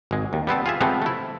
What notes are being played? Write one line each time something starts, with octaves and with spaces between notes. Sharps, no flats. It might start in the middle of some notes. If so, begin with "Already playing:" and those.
G#1 G#3
D#2
G3 B3 C4 A5
F4 G#4 E5
C3 F3 G#3 A3 B3 C4
A3 E4